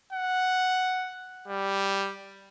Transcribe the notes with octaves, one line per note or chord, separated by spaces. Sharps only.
F#5
G3